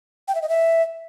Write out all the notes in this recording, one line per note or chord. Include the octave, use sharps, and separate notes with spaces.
G5
E5
D#5
E5